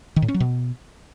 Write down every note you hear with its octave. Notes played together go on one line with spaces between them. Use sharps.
D#3
A2
C#4
F#3
B2